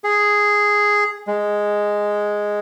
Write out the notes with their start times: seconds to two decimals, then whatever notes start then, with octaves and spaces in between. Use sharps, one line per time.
0.04 G#4
1.27 G#3